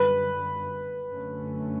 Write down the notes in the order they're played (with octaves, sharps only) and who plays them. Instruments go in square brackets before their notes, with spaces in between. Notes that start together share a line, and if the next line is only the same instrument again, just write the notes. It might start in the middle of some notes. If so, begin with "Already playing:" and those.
Already playing: [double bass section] F#2 D3 G3 [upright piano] B4
[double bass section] F#2 D3 A3 C#4